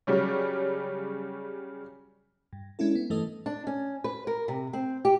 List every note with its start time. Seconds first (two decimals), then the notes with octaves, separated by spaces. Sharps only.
0.07 C#3 F#3 G3 C#4
2.53 G2
2.79 G#3 C#4 D4 E4 A4
2.95 B3
3.10 G2 E3 A3 A4 D#5 D#6
3.46 D4
3.67 C#4
4.04 B4
4.27 A#4
4.48 C3
4.73 C4
5.05 G4